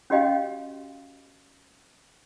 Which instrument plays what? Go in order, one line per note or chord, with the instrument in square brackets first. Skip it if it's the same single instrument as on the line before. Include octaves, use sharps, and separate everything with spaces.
[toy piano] C#4 F#4 G4 D#5 F5 G5